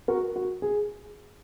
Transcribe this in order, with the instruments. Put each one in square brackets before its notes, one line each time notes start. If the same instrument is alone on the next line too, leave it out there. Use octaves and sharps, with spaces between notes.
[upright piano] F#4 A#4
F#4
G#4